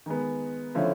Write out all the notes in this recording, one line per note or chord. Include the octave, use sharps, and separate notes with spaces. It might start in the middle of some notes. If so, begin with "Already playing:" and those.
D#3 G#3 B3
D3 F3 A3 C#4 E4